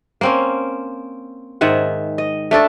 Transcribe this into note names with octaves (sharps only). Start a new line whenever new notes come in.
A#3 C4 C#4
G#2 D#3 E5 F#5
D#5
A3 D4 A4 D5